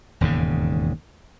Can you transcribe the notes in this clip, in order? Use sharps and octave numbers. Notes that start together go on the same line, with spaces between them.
E1 D#2 G#2 C#3